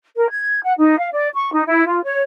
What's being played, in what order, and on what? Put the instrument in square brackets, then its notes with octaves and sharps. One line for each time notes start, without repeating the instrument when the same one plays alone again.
[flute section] A#4
G#6
F#5
D#4
F5
D5
C#6
D#4
E4
F4
C#5